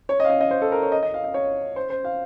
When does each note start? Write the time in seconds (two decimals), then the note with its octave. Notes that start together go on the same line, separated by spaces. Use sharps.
0.09 C#5
0.20 D#5
0.25 F5
0.30 D#5
0.41 D#5
0.51 C5
0.62 A4
0.72 A#4
0.83 C#5
0.92 D#5
1.03 D#5
1.14 F5
1.24 D#5
1.34 C#5
1.76 C5
1.90 C5
2.04 F5